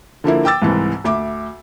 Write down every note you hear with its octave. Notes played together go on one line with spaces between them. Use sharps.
D3 F3 A#3 E4
G5 D6 E6 A6
C2 G#2 E3
D2 E5 D6